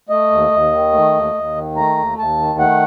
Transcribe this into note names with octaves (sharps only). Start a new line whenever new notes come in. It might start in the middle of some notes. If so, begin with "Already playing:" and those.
A3 D#5
D#2
D#2
D#3
A3
D#2
D#2
D#3
A3 A#5
D#2
D#2 A5
D#3
A3 F#5